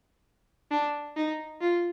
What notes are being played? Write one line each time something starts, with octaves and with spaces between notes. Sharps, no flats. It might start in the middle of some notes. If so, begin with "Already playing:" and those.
D4
D#4
F4